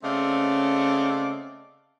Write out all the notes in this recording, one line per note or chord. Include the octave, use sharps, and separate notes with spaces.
C#3 A3 C4 D5 D#5 F5